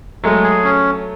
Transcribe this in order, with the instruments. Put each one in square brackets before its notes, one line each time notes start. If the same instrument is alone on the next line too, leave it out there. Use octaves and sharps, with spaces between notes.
[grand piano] F#3 A3 [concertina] G#3
[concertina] G#4
C#4